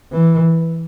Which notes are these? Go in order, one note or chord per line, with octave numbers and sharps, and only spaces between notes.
E3